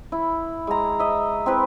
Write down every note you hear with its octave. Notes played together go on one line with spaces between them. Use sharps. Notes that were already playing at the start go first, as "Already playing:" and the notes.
E4
G#3 A#5
D#5 E5
C4 E4 B4